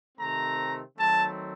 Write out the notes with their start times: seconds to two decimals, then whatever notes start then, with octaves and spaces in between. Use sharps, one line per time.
0.18 C3 D#3 A3 C4 A#5
0.97 D#3 F#3 A3 C4 A5